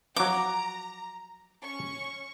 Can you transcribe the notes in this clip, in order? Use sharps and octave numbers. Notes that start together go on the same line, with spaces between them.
F3 F#3 A#5 D6
C#4 C#6